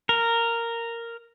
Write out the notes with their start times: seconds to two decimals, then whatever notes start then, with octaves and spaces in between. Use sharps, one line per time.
0.09 A#4